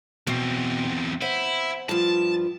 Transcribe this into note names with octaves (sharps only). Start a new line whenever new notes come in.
E2 B2 C4
E4 C5 F#5 G#5
G2 F3 A5